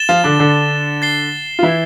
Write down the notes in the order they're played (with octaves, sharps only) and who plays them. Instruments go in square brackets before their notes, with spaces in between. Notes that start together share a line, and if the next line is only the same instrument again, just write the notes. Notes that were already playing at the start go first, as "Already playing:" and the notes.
Already playing: [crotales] A6 E7 G7
[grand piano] F3 F4
D3 D4
D3 D4
[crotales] A6 C7 G7
[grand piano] F4
E3 E4